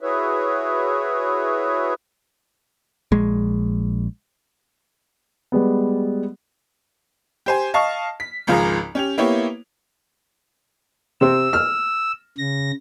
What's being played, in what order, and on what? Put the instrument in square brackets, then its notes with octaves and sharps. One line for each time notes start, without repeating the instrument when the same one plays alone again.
[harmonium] E4 F#4 G#4 B4 C#5 E5
[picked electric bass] A#1 G#3
[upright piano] G3 G#3 B3
[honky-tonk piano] G4 C5 G#5
D#5 F5 A5 C#6
B6
G#1 C#2 F3 F4 G#4 A#5
C#4 G4 F7
A#3 B3 E4 G4 C#5
[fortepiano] C3 C4 [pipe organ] E6
[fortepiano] F6
[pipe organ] C#3 A#6